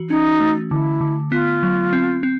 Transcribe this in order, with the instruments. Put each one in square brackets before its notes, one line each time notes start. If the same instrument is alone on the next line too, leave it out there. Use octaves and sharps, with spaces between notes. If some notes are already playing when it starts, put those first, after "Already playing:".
Already playing: [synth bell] E3 F#4
[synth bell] C#4 [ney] D#4
[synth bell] A3
[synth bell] D3 [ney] E4
[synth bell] D3
[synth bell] B3 [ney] F4
[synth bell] F#3
C4
C4